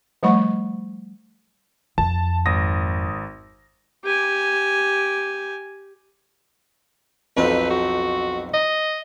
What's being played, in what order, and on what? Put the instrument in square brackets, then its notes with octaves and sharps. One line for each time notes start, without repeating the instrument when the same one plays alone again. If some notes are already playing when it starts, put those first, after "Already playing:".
[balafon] F3 G3 A3 F#5 B5 C#6
[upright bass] F2 [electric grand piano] A5
[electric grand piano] G#1 D#6 A#6
[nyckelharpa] G4 G#5
[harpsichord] B1 F2 C4 [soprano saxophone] B4
[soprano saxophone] F#4
D#5